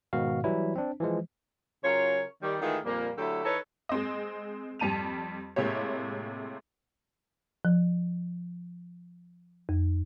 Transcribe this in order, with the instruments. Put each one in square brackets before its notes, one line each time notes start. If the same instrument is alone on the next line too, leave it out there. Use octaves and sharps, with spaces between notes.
[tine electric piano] G#2 B2 D#3 F#4 F5
E3 F#3 G3 E4
C4 D4
E3 F3 G#3
[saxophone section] C#3 F#3 F4 A#4 C#5
D#3 G3
D#3 E3 G#3 A3 F4 G#4
F2 A#2 G3 A#3
D3 F#3 A3 E4 G4 A4
E3 D#4 A4 B4 C#5
[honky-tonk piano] G#3 C4 D#5
F2 G3 A5 D#7 F7
A2 C3 G#3 A#3 G4 C#5
[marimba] F3
F2